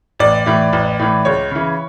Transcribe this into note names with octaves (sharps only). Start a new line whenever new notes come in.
A1 D5
A2 E3
A1
A2 E3
C#2 C#5
C#3 E3